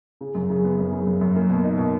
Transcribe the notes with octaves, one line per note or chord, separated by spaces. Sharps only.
C#3
F#2
C#3
B3
F#2
C#3
F#2
F#2
A#3
B2
D#4
B2